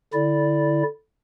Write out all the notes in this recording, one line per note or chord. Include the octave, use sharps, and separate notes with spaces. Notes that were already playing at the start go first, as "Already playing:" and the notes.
D3 E4 D5